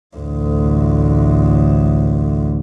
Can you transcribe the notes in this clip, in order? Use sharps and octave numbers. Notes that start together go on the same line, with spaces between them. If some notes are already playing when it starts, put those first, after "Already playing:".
A1 D2